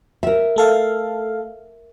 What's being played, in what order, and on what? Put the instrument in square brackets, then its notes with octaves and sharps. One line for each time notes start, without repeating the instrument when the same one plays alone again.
[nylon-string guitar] A#4 E5
[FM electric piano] A3 A4 F5